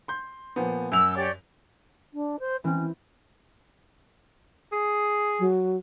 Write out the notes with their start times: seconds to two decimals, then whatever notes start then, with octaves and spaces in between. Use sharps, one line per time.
0.08 C6 G6
0.56 A#2 F3 B3
0.92 F#2 E6 F7
1.16 G4 C#5 D5
2.13 D4
2.39 C5
2.64 E3 C4 C#4
4.72 G#4
5.40 F#3